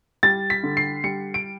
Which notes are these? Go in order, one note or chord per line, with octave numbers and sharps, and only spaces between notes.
G3 A6
B6
D3
C7
G3 C#7
D7